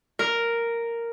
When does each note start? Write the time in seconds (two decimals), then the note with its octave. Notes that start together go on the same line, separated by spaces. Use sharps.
0.19 A#4